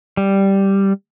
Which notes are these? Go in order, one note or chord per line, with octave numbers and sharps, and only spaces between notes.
G3